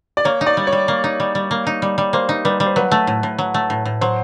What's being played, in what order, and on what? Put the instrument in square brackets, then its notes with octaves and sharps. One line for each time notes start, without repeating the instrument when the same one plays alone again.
[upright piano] D5
[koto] A#3 [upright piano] C#5
[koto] D#4
[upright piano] D5
[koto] G3
[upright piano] C#5
[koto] G3
A#3
D#4
G3
G3
A#3
D#4
G3
G3
[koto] A#3 [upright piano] C5
[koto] D#4
[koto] G3 [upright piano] B4
[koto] G3
[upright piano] C5
[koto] F#3 [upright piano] B4
[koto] A3
A2
A2
F#3
A3
A2
A2
[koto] F#3 [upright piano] C5